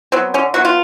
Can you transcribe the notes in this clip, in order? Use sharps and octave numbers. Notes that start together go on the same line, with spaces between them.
F#3 B3 C4
D3 C#4
F#3 B3 F#4
F4